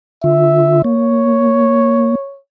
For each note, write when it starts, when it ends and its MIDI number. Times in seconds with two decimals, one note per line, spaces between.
0.24 0.82 50
0.24 0.82 65
0.24 0.81 76
0.84 2.15 58
0.84 2.39 73